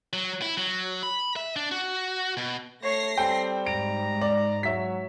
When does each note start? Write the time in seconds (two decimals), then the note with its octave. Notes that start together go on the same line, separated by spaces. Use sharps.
0.13 F#3
0.42 E4
0.57 F#3
1.03 B5
1.36 E5
1.56 D4
1.71 F#4
2.37 B2
2.83 A3 C#5 A#6 C7
3.18 G3 C4 A4 G5
3.67 G#2 A#5 D7
4.21 D5
4.63 F#3 C#5 E5 B6